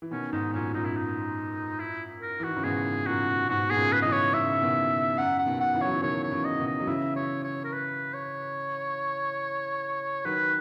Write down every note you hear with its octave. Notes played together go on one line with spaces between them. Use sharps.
E3
B2 D#3 C#4
G#2 D#4
F#2 A#2 C#4
F#2 A#2 D#4
E4
D#4
E4
A#4
E3
D#3 F#4
C#3
G#2 B2 G#4
F#2 A#2 F#4
G#2 B2 F#4
B2 G#4
A#2 C#3
B4
C#3 E3 D#5
C#5
C#3 E3 E5
B2 D#3
F#2 F#5
F#5
B2 D#3
F#5
C#3 E3
F#3 C#5
E3
B2 D#3 C#5
C#5
C#3 E3
D#5
B2 D#3
D#5
F#3
C#3 E3 E5
C#5
C#5
A#4
B4
C#5
D#3 F#3 B4